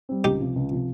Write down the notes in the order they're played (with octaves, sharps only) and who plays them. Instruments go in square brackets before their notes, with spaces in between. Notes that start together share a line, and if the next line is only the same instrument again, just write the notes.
[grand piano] G3 C4
[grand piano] C#2 [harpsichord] D#4 G4
[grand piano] C3 F3
C#2
C3 F3